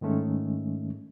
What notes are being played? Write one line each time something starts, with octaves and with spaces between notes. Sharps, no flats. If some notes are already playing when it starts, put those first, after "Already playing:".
G#2 D#3 G#3 A3 C#4